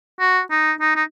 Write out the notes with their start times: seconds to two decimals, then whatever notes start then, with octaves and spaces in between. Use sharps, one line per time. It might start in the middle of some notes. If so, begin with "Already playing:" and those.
0.20 F#4
0.51 D#4
0.80 D#4
0.96 D#4